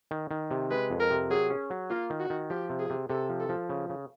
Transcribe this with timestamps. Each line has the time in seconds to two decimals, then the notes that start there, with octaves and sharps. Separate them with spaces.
0.11 D#3
0.31 D#3
0.51 C3
0.71 G#3 B4
0.90 F2
1.00 A#4
1.10 C3
1.30 F#3 G#4
1.50 C#4
1.70 F#3
1.90 A#3 F4
2.10 D#3
2.20 F#4
2.30 D#3
2.50 F3 G4
2.70 C3
2.79 G#4
2.90 C3
3.09 C3 A4
3.29 F3
3.40 A4
3.49 F3
3.69 C#3
3.90 C#3